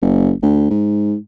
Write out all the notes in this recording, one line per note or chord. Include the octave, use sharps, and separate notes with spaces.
F#1
D2
G#2